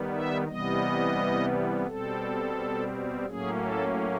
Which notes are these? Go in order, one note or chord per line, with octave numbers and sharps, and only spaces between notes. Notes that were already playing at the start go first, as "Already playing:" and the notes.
Already playing: D#3 G3 B3
E5
C3 E3 G3 B3 D#5
B2 G3 C4 A4
A2 F#3 A#3 C#4 G#4
A4